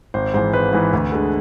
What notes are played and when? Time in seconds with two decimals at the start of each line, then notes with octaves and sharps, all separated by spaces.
0.14 G#1 C5
0.34 G#2 E3 C5
0.53 G#1 B4
0.73 G#2 E3
0.93 D2
1.12 D3 G#3